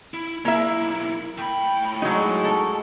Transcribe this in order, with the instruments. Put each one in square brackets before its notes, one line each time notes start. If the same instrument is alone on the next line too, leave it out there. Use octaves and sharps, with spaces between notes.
[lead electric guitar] E4
[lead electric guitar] B1 E4 [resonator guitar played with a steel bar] A#3 E5
[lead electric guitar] A2 B5 [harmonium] G5
[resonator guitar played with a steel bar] F#3 D#4 [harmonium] G#3 F#4
[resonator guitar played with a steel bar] A4